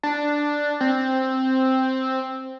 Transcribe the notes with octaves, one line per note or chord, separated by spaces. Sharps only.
D4
C4